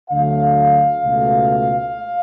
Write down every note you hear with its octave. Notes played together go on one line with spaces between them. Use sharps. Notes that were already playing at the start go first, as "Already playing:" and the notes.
D2 D3 F#3 A3 F5
C#2 B2 A3